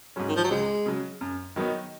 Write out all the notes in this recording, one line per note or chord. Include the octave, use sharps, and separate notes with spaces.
G#2 F#3 C#4
D#3
F3
F#3
C#2 G#3
C#3 F#3
F#2
D#3 F#3 B3 D#4